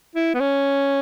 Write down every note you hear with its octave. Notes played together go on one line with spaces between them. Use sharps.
E4
B3
C#4